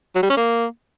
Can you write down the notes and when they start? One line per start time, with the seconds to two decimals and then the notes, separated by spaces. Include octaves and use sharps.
0.15 F#3
0.23 G3
0.30 C#4
0.37 A#3